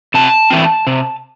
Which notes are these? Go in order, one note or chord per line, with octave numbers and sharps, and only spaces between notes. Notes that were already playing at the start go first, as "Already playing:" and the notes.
C3 A5
E3 A3 C4
C3